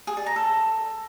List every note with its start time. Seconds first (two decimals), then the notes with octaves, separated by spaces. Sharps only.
0.07 G#4
0.17 D5
0.26 A#5
0.36 A4